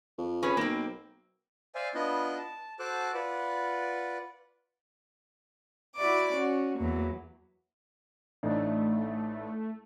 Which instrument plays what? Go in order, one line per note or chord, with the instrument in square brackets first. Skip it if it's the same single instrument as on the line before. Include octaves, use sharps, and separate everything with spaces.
[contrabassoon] F2
[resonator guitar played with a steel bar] C#4 G#4 B4
[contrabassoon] B1 [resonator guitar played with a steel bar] A#3 C4
[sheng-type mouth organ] C5 D5 E5 F5 G#5
B3 D4 E4 F4 D#5 F#6
A5
F#4 A4 C5 A5 D6 F#6
F4 B4 D5 F#5
[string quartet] E4 F#4 D5 D6
C#4 F#4
E2 F#3 A#3
[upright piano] A1 D4 D#4 [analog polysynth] A3